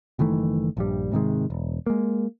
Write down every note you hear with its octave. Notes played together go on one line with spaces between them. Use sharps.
F#1 D#3 E3 A3
A#1 G2 G3
G#2 C3 D#3 G#3
E1
G#3 A#3